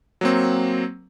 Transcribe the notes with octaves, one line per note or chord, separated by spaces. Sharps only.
F#3 A#3 C4